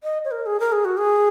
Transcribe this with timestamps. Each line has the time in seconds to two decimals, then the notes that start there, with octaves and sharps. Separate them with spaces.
0.03 D#5
0.25 C#5
0.31 A#4
0.46 G#4
0.60 A#4
0.72 G#4
0.85 F#4
0.97 G#4